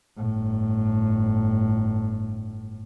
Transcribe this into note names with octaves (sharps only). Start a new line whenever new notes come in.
G1 A2